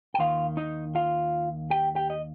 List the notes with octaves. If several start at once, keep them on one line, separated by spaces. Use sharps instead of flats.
G5
D#2 D#3 F4 F5
D#4 D#5
F4 F5
G4 G5
G4 G5
D#5